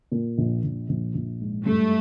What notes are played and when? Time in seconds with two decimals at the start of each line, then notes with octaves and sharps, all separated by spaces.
0.11 A#2
0.38 A#1
0.64 A#1
0.89 A#1
1.14 A#1
1.40 G#2
1.66 G2 A3